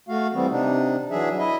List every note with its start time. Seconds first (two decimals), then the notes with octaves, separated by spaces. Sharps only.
0.08 A3 F#4 F5
0.34 E3 G3 B3 C4
0.51 C3 D4 D#4
1.11 E3 F#3 D4 G#4 E5
1.39 E4 D#5 E5